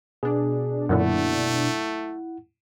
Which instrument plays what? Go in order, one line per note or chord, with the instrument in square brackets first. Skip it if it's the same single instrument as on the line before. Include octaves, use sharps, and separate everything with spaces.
[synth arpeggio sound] B2 D4 [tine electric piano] G#4
[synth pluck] F#2 A#2 D3 [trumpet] A3 [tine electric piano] E4 F#5